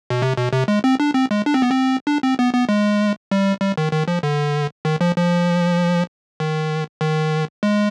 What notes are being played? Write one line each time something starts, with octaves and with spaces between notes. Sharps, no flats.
B2
C3
B2
C3
G#3
C4
D4
C4
G#3
D4
C4
B3
C4
D4
C4
B3
B3
G#3
G3
G3
D#3
D#3
F3
D3
D#3
F3
F3
D#3
D#3
G#3